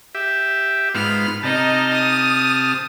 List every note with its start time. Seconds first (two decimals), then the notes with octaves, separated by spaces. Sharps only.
0.15 G4 E5
0.94 G#2 B3 F4 B5 F6
1.43 C3 D#4 D#5 A5 F6
1.93 D#6